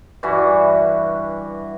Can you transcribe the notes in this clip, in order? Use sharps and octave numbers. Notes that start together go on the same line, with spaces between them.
G2 E3 F#4